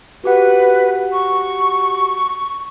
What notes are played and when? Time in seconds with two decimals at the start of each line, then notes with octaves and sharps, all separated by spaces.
0.24 F#4 G4 B4 F#5
1.12 C#6